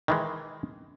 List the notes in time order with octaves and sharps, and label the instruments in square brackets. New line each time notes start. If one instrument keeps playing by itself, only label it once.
[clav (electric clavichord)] D#3 E3 G#3